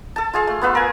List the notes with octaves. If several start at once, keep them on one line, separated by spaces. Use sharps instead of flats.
A4 A5
F4 G#4 F5
A3
B3 F4 B4 E5
A#4 G#5